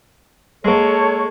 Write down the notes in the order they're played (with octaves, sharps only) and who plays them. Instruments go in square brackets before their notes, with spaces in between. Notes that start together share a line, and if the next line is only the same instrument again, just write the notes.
[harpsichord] G#3 A#3 [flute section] A4 C#5 C#6